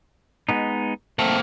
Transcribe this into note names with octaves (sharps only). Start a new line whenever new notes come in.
G#3 B3 D#4
A3 A#3 C4